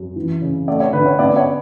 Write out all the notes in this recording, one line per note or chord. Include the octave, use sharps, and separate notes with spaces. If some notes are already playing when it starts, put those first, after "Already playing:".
Already playing: F#2
E3
C#3
A3 D5
C#5
D3 B4
C#5
B3 D5
C#5